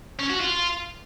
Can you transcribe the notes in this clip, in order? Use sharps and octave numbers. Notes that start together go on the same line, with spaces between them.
C#4
F#4
F4